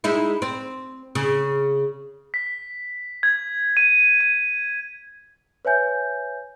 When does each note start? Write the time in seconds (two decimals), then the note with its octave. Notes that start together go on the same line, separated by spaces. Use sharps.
0.04 G#3 D#4 E4
0.42 C4
1.15 C#3
2.34 B6
3.23 G#6
3.77 D#7
4.21 D#7
5.65 B4 C#5 E5 G#5 G6